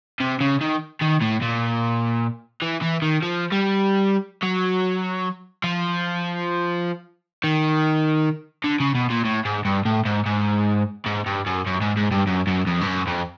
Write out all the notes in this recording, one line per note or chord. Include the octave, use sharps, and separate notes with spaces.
C3
C#3
D#3
D#3
A2
A#2
E3
E3
D#3
F3
G3
F#3
F3
D#3
D3
C#3
B2
A#2
A2
G#2
G2
A2
G#2
G#2
G#2
G2
F#2
F#2
G#2
G#2
G2
F#2
F#2
F2
G2
F#2
F2